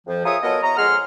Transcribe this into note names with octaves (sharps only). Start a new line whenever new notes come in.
F2 F3
F4 G#4 A#4 C#5 E5 D#6
F#3 B3 A4 A#4 C#5 D#5
E4 C#5 D#5 A#5
F2 G#3 G#4 F#5 C6 F6